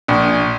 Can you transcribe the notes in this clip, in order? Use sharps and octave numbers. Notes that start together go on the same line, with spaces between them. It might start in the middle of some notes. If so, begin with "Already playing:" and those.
A#1